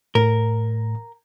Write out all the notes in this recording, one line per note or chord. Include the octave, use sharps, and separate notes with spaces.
A2 A#4